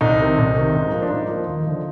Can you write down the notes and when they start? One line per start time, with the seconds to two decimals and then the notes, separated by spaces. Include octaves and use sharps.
0.01 C2 D#4
0.20 C3 D#3
0.38 C2
0.57 C3 D#3
0.75 G#2
0.92 F3 A#3
1.02 D4
1.10 G#2 D#4
1.29 F3 A#3
1.47 D#2
1.66 D3 F3